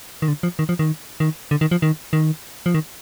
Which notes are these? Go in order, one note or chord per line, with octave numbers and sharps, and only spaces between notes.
D#3
D3
F3
D#3
F3
D#3
D#3
D3
D#3
F3
D#3
D#3
F3
D#3